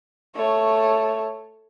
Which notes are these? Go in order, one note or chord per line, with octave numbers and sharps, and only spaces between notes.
A3 C#5